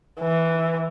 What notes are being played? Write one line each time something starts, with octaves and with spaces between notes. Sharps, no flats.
E3